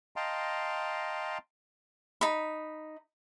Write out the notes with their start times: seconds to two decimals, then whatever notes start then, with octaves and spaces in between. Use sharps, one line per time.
0.16 D#5 F5 G5 A5 A#5 C6
2.21 D#4 B5